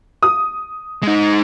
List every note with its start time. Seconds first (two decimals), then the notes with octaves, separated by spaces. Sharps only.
0.23 D#6
1.03 G#3 D#4